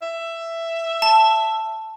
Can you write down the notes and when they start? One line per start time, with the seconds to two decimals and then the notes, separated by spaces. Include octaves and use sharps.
0.02 E5
1.02 A5